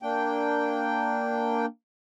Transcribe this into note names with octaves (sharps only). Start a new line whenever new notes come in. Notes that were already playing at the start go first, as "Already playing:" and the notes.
A#3 D4 G5